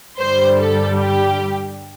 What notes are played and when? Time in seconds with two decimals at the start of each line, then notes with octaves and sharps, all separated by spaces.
0.18 G2 D3 G3 C5
0.58 A4
0.98 G4